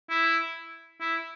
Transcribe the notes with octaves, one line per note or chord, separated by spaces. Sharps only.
E4
E4